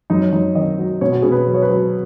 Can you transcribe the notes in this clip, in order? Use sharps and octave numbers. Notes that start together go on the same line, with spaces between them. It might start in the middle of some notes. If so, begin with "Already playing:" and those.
F#2 D#4
C#4
F#2 D#4
D#3 D#5
F#3
B2 C#5
F#4
B2 G#4
B4
F#3
C#5
B4
F#3